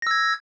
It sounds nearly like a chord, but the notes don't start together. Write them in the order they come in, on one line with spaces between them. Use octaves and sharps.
A#6 E6 G#6